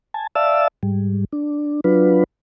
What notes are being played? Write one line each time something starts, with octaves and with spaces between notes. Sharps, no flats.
G#5 A5
D5 E5 F5 A5 E6
G#2 G3
D4
F#3 D4 F4 B4